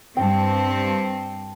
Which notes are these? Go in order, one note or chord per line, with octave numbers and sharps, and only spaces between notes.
G2 C4 G5 A5